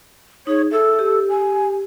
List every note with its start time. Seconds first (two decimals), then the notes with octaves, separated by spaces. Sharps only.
0.47 D#4 G#4 C#5
0.71 A4 E5
0.99 G4
1.29 G#5